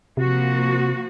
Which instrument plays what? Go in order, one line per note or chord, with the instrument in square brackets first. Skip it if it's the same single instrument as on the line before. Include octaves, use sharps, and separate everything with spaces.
[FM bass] C3 [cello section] F3 A#3 F#4